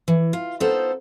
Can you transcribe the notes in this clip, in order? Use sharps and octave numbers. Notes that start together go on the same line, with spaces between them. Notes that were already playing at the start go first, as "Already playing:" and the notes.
E3
F4
B3 D#4 F4 A4 C5